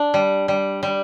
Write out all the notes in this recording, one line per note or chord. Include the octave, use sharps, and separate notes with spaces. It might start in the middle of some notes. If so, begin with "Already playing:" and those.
Already playing: D4
G3
G3
G3